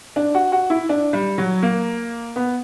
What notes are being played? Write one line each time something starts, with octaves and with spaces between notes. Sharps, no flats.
D4
F#4
F#4
E4
D4
G3
F#3
A#3
B3